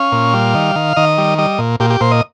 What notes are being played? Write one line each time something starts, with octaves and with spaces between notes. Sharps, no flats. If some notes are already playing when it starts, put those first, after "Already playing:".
Already playing: C#4 F5
A#2
G3
D#3
D#3
D#3 D#5
G3
G3 D#5
A#2
A#2 G4
G4
A#2 C5
D#5